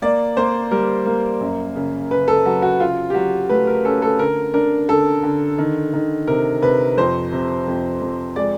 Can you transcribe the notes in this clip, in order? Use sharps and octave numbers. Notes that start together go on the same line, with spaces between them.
A#3 D5
A#3 C5
G3 A#4
A#3
F#2
C#3
C#3 B4
A4
F#3 F#4
F#4
C#3 F4
G4
F#3 F#4
A3 B4
A#4
C#4 A4
A4
D3 A#4
D4 A#4
D3 A4
D3
D#3
D#3
C3 A#4
C3 B4
F2 C5
C3
F2
F2
G#3 D5